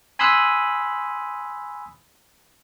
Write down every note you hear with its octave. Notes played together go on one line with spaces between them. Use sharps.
G#5 B5 C6 D#6 E6 F#6